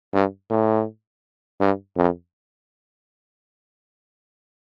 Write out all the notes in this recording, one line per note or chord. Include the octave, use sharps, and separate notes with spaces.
G2
A2
G2
F2